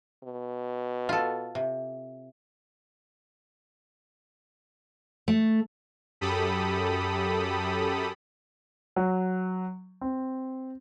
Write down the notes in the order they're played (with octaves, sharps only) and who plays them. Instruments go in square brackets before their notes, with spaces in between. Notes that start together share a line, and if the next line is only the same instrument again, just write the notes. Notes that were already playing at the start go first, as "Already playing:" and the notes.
[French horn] B2
[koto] F4 A4
C3
[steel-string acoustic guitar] A3
[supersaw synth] F#2 G4 A4 B5 D#6
[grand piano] F#3
C4